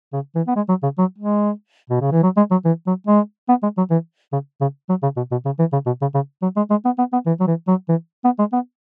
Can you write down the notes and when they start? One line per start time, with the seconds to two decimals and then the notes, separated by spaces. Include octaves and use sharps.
0.13 C#3
0.35 E3
0.47 B3
0.56 G#3
0.69 F#3
0.83 C#3
0.98 F#3
1.19 G#3
1.90 B2
2.01 C#3
2.12 E3
2.23 F#3
2.37 G#3
2.51 F#3
2.65 E3
2.87 F#3
3.07 G#3
3.49 B3
3.63 G#3
3.78 F#3
3.91 E3
4.33 C#3
4.61 C#3
4.89 F#3
5.03 C#3
5.17 B2
5.31 B2
5.45 C#3
5.59 E3
5.72 C#3
5.86 B2
6.01 C#3
6.15 C#3
6.42 F#3
6.57 G#3
6.70 G#3
6.85 B3
6.98 B3
7.13 B3
7.26 E3
7.40 F#3
7.47 E3
7.68 F#3
7.89 E3
8.25 B3
8.39 G#3
8.53 B3